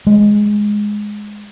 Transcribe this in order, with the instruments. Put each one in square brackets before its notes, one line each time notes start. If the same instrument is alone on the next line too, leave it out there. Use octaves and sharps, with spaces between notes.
[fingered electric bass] G#3